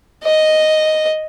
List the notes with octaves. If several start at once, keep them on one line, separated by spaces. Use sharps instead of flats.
D#5